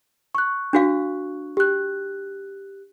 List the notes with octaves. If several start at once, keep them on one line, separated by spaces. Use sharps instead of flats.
C#6 F#6
D4 F#4 F5
G4 F#6